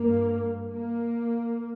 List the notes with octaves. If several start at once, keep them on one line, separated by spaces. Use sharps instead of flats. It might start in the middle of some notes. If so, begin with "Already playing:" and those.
Already playing: G2 A#3
A#3